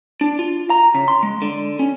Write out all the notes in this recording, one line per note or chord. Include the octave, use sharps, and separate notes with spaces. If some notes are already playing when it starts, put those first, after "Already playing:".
D4
F4
A#5
C#3
C6
G#3
D3
C#4